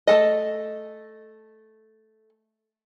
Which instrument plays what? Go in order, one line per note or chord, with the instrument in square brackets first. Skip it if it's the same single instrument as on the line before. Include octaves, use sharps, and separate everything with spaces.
[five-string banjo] A3 A4 D#5